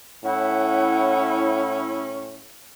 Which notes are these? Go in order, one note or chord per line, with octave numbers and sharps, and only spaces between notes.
A2 C#4 E4 F#5